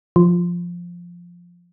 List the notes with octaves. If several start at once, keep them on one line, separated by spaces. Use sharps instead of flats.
F3